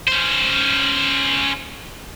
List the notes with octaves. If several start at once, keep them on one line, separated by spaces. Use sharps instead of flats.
C#4 C5